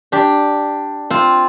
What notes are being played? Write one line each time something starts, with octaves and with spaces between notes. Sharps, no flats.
D4 G4
C4 F4